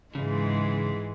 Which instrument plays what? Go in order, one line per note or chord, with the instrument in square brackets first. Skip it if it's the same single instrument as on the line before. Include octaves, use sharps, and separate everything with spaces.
[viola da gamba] G#2 E3 G#3 [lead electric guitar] C#3